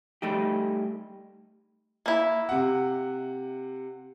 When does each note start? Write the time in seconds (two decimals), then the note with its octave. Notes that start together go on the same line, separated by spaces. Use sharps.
0.22 G3 A3 D#4 G4
2.06 A#3 E4
2.49 C3 F#5